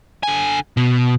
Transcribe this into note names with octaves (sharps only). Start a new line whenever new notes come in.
D3 G#5
B2